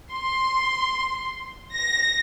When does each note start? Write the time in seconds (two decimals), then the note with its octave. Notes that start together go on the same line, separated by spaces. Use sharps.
0.10 C6
1.72 A#6